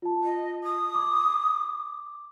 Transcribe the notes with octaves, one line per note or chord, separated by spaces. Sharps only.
F4 A5
D#5
D#6
D6